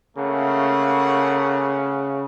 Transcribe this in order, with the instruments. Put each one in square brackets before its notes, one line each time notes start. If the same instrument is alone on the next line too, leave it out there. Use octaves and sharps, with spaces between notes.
[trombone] C#3 [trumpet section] A3 A#3 F#5